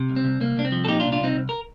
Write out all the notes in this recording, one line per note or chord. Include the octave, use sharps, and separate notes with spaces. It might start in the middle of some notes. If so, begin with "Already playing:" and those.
Already playing: C3
C2
C4
C2
C2 A#3
C2 D4
C4
F3
A4
A#2 D#4 G4
D4 F4
C2
D4 F4
C2 C4 D#4
C2
A#4